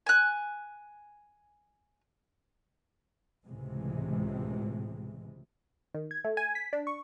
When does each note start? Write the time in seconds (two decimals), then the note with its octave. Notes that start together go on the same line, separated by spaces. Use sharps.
0.06 G#5 F#6
3.46 C#2 A2 C3 E3 G#3
5.94 D#3
6.11 G#6
6.24 A3
6.37 G#5
6.55 B6
6.73 D4
6.87 C#6